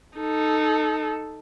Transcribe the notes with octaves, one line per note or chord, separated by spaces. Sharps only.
D#4 A4